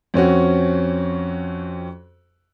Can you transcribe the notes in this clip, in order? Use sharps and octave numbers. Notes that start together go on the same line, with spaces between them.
F2 C4 C#4 F#4